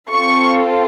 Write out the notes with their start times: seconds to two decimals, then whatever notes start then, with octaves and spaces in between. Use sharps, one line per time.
0.11 C4 F4 A4 C#6